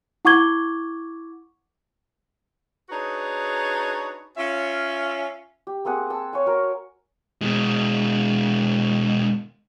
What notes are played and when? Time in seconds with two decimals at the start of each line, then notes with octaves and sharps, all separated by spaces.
0.25 E4 F#5 C#6 D6 G#6 G7
2.89 D4 D#4 F#4 G#4 B4 C#5
4.37 C#4 F4 E5
5.67 G4
5.85 A#3 C4 G#4 F#5
6.10 A5 E6
6.33 C#5 F5 G#5
6.46 F#4 A#4
7.42 B2 G#3